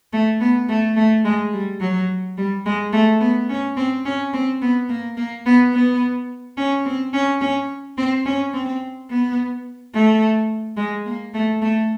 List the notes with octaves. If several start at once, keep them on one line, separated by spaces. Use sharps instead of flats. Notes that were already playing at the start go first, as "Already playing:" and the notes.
A3
B3
A3
A3
G#3
G3
F#3
G3
G#3
A3
B3
C#4
C4
C#4
C4
B3
A#3
A#3
B3
B3
C#4
C4
C#4
C#4
C4
C#4
C4
B3
A3
G#3
A#3
A3
A3